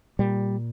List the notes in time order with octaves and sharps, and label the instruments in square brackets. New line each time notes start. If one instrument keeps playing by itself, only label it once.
[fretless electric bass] A#2 G3